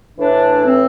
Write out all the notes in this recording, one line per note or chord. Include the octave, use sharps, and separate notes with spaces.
A2 E3 D4
C4